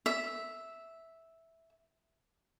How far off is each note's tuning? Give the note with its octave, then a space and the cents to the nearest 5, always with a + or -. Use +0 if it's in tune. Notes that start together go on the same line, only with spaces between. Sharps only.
E5 -5